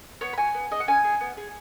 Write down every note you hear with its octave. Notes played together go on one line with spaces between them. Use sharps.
B3 C#5
B5
F#4 G#5
B3
G#4 D#5
F#5
C#4 G#5
G#4
B3
G#4